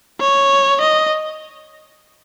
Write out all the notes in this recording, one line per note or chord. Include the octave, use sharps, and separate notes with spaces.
C#5
D#5